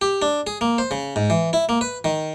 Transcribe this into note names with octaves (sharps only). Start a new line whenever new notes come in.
G4
D4
G#4
A#3
C5
C#3
G#2
E3
E4
A#3
B4
D#3